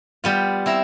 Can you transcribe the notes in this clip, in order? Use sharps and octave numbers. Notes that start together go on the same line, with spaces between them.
G3 B3 F4
C4 E4 A#5